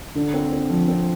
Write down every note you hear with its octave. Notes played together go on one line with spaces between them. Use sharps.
D3
C4
C4
F3
C4